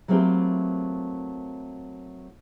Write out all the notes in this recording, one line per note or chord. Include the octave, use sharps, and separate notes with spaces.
F#3 A3 A#3 C4 E4 G4